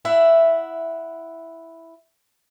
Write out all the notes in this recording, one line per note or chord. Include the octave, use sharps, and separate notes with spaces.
E4 E5 F#5